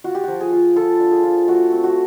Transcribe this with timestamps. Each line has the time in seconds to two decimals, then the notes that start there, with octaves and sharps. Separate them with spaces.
0.04 F4 F#4
0.15 G4
0.24 F3 F#4
0.41 G#4
0.52 F4
0.76 F4 A4
1.00 D4
1.11 G#4
1.23 F4
1.48 A3 F#4
1.72 C4
1.84 F#4